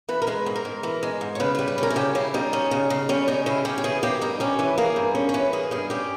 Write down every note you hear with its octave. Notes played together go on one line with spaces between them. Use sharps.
E3 B4
A#4
G#3 B4
G#2
A#4
G#2
E3 A#4
G#3
G#2
C#5
C#3 B4
G3 B4
B4
C#4 A#4
E4
C#3 G4
C#3 E4
G3 D#4
C#4
C#3
C#3
G3 C#4
C#4 D#4
C#3 E4
C#4 G4
G4
E3 G#4
A#3 G4
G2 D#4
C#4 G4
E3 B4
A#3 G#4
G2
C#4
C#5
E3 B4
A#3 G#4
G2 G#4
C#4 G4